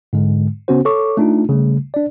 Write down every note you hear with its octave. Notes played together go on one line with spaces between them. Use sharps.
G#2 D3 G#3
C#3 B3 C#4 F#4 C5
A4 C#5 C#6 D6
A3 D4 D#4 F4
C#3 G3 A3
D4 D5